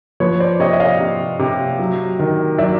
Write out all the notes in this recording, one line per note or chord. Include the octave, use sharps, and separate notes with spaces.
F3 B4 C#5
C5 D5
C3 C#5 D#5
E5
D#5 F5
C3
C3
F#3
D#3
F#3 D5 E5